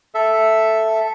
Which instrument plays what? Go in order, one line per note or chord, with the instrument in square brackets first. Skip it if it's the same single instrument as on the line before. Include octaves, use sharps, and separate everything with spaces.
[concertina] A4 E5